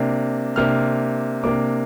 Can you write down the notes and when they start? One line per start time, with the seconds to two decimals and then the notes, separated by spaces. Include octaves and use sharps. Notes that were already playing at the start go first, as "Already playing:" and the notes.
Already playing: C3 A#3 D4
0.56 C3 A#3 D4 F6
1.43 C3 A#3 D4 D6